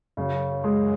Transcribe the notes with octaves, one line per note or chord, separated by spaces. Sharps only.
F#2 C#3
G#3